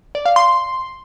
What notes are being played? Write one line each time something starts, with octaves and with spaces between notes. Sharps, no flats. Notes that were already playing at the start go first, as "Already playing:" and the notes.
D5
F5
C6